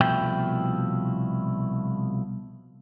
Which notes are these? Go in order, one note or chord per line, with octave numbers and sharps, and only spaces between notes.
C2 B2 F3 A3 E4 G5